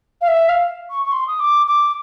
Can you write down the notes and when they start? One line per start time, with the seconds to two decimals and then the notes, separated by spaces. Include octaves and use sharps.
0.21 F5
0.28 E5
0.49 F5
0.90 C#6
1.04 C#6
1.12 C6
1.27 D#6
1.40 D6
1.67 D6